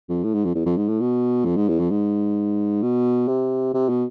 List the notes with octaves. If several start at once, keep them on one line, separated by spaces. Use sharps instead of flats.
F2
A2
G#2
F2
E2
F2
G#2
A2
B2
F2
G#2
E2
F2
G#2
B2
C3
C3
B2